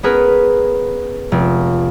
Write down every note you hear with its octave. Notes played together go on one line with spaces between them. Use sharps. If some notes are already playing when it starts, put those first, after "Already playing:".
B3 C#4 G#4 A#4 B4
F1